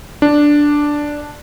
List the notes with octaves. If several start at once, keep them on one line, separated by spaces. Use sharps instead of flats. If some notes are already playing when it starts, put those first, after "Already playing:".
D4